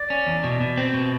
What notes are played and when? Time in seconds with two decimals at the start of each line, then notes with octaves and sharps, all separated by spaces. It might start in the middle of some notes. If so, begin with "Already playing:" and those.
Already playing: D5
0.10 C#4
0.27 E2
0.44 B2
0.61 B2
0.78 C4
0.94 B2